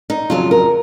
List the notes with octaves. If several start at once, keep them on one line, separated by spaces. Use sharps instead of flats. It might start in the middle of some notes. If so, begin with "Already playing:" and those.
D#4
F2 C#3 F#3 F4
A#4